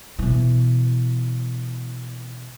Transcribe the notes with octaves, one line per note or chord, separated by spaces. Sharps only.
B2 E3